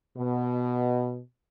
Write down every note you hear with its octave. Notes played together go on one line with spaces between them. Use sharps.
B2